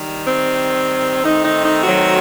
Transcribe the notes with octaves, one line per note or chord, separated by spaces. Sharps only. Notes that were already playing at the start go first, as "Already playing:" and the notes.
Already playing: D#3 G3
C4
D#3 A3 C4 D#4
D#4
D#4
F#3 F#4